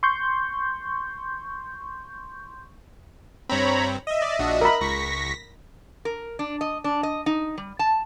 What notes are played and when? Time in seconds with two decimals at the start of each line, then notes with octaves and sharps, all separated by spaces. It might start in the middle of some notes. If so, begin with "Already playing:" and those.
0.03 C6 C#6 G6
3.49 G2 C4 C#5 A#5 B5
4.07 D#5 E5
4.22 D5
4.39 A#1 D4 F#4
4.61 A#4 B5
4.81 C#2 C#6 A#6 B6
6.05 A#4
6.39 D4
6.61 D#5
6.84 D4
7.03 D#5
7.26 D#4
7.58 G3
7.79 A5